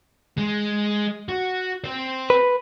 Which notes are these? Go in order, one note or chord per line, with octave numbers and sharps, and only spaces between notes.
G#3
F#4
C4 C5
B4